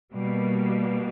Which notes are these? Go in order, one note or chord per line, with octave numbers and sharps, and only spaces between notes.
B2 G3 A#3